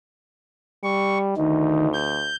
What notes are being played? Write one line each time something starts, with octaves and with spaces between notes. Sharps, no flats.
G3 C#6
D2 D#3 D#4
G6